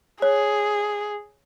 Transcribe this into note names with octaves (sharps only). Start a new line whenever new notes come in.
G#4 C#5